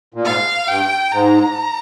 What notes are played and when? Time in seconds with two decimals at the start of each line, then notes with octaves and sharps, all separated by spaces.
0.14 A#2
0.24 G#2 F5
0.68 G2 G5
1.12 G#2 A#5